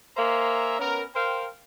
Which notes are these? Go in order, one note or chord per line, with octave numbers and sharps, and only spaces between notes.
A#3 C5 E5 G#5 A#5
B3 C#4 A#4
A#4 C5 F5 G5